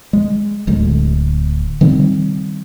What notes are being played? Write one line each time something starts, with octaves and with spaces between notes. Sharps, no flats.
G#3
D1 D2 G#3
D#3 G3 C4